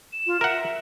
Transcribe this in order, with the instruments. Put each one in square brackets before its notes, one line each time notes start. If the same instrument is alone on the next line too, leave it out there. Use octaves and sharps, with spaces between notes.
[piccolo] E7
[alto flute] F4
[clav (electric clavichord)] A#4 F#5 [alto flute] E5